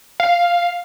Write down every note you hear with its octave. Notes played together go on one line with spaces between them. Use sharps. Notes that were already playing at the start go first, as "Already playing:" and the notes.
F5